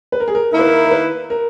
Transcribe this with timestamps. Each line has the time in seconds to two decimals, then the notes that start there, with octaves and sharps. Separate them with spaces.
0.12 B4
0.20 A#4
0.28 G#4
0.35 A#4
0.51 D#3 A#3 E4 A#4
0.59 B4
0.67 A#4
0.85 A#4
0.91 B4
1.30 A#4